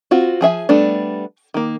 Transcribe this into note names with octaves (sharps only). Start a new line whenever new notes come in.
C4 F4 F#4
F3 G#4 E5 G#5
G3 A3 B3 D4
D#3 A#3